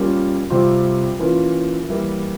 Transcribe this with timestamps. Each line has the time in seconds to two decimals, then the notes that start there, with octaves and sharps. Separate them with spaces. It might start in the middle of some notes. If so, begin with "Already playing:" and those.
Already playing: G3 A#3 C#4 F4
0.50 C3 G3 C4 F4
1.19 E3 A#3 C#4 F4
1.89 E3 G3 A#3 E4